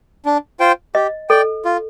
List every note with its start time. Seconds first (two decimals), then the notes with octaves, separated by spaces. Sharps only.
0.25 D4
0.60 F4 C5 G5
0.95 G4 D#5
1.29 A4 D5 G5
1.65 F4